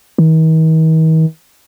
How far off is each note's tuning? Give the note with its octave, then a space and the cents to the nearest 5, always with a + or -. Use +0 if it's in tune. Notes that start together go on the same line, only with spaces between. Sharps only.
D#3 +45